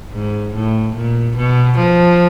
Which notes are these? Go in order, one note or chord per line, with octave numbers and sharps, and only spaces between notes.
G#2
A2
A#2
B2
F3